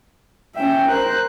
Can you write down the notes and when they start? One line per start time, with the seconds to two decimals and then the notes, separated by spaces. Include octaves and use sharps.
0.56 C#4 E5 G5
0.89 A#4 C5 F#6